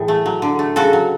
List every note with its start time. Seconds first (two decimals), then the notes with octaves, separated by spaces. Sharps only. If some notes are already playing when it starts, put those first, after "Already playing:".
Already playing: A2 E3 G#4
0.08 A3
0.26 F#3
0.42 D3
0.59 A3
0.76 C#3 F#4 A4
0.93 F#3